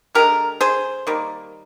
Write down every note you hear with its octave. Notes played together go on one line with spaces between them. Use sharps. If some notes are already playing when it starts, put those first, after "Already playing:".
D3 G#3 G4 A#4
G#4 C5
D#3 G3 A#3